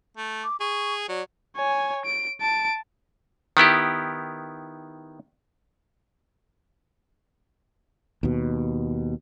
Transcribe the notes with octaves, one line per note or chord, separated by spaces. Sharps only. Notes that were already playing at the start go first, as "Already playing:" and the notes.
A3
D6
G#4 C#6
F#3 D5
C#5 G#5
D7
A5 D7
D#3 B3 E4 G4
D#2 B2